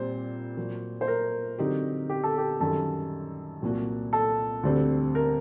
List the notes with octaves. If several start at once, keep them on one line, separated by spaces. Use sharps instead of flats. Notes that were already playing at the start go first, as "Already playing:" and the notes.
Already playing: A#2 G3 C4 C5
A#2 F#3 A#3
C5
A#4
D3 F#3 C4 D#4 G4
G4
A4
G4
F#2 D#3 G3 A4
C2 A#2 F#3 A#3 F#4
A4
D2 D3 G3 C4
A#4